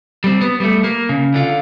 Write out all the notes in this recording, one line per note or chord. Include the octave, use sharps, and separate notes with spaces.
G3 C4
B3
G3 A3
A#3
C#3
D3 F4